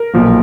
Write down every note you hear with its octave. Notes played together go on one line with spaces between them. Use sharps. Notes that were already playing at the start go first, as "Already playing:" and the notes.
Already playing: A#4
B1 A#2 F3 A#3